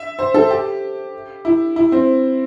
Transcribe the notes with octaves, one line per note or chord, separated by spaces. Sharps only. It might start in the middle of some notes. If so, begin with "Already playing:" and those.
Already playing: E5
C5
A4
G4
E4
E4
C4